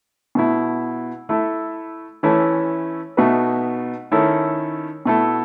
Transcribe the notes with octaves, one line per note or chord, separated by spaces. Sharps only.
B2 A3 E4
A3 E4 A4
E3 A3 C#4 E4 A4
B2 A3 D#4 F#4 B4
D#3 A3 C#4 E4 A4
B2 A3 E4 A4